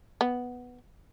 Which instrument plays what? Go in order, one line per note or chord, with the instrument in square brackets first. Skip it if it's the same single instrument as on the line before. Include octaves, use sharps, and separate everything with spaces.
[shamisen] B3